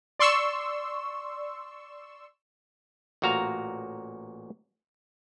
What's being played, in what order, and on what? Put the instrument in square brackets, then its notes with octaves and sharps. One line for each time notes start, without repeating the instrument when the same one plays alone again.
[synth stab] D5 C6 C#6 E6
[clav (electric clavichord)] A1 A#2 F#4 F5 A#5